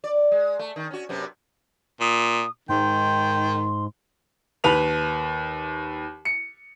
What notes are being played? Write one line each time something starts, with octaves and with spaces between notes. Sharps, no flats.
D5
G#3
A3
D#3
C#4 F#4
F#2 C3 B3
A#2 D#6
G#2 D#3 G5 C6
D#2 B4 B5 F7
C#7